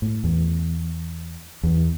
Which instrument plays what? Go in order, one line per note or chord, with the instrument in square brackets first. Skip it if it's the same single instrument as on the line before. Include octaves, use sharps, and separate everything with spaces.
[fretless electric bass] A2
E2
E2